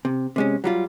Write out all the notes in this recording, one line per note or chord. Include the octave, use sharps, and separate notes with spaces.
C3
C3 G#3 C#4
F#3 G3 F4